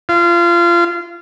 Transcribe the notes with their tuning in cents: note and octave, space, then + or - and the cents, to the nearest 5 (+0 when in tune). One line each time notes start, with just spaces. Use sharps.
F4 -25